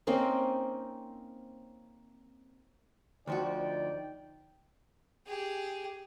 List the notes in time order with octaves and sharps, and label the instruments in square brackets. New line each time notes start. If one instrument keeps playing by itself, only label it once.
[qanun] A#3 C4 C#4 D#4
[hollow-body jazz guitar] D2 F3 F#4 [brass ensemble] D#4 D5 G5
[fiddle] G4 G#4